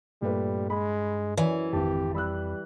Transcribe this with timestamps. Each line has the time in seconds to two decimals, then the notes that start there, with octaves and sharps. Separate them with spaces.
0.22 G2 A#2 G3 A3 B4
0.70 G#3 B5
1.37 F#2 E3 C#5 D5 G#5
1.73 G#1 F2 G4 A5
2.15 G3 B5 E6 F#6